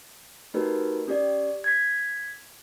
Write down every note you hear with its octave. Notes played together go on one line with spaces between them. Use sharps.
A3 D#4 F#4 G4 A#4 B4
C#4 G4 D5
G#6 B6